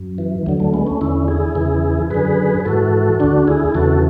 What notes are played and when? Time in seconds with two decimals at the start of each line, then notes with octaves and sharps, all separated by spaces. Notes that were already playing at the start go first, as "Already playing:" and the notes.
Already playing: F#2
0.18 E3
0.46 D2 D3 F#3
0.60 F#3 A3
0.73 G#3 B3
0.87 A3 C#4
1.01 E2 D3 C#4 E4
1.28 E4 G#4
1.55 E2 C#3 E3
2.10 F#2 D3 G#4 B4
2.65 G#2 E3 F#4 A4
3.20 D2 D3 D4 F#4
3.48 E4 G#4
3.75 E2 C#3 E3 F#4 A4